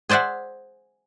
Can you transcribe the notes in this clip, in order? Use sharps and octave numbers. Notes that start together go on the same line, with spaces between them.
G#4 C5 D5 E5 F#5